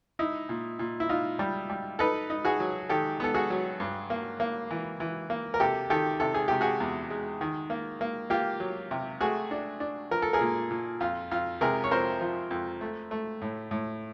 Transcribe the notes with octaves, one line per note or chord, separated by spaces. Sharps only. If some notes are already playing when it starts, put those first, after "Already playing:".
D#4 E4
A#2
A#2
E4
D#4 F4
G3
G3
D#4 A4 B4
D#4
F#4 G#4
F#3
D#3 G4 A4
B3 A4
F#4 G#4
F#3
G2
A#3
A#3
E3
E3
A#3
A#4
C3 G4 A4
D#3 G4 A4
C3 A4
G#4
C3 G4
F#4 G#4
E2
G#3
D#3
A#3
A#3
A#3 F4 G4
F#3
C3
A3 F#4 G#4
D4
D4
F3 A#4
A4
G#4 A#4
A#2
A#2
F2 F4
F2 F4
C3 G#4 A#4
C#5
F2 A#4 C5
F3
F2
A3
A3
A2
A2